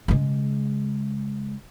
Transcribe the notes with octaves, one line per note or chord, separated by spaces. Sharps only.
C#3 G#3